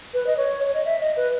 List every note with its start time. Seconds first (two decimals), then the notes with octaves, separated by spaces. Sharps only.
0.14 B4
0.27 D#5
0.37 C#5
0.64 C#5
0.74 D#5
0.85 E5
1.01 D#5
1.17 B4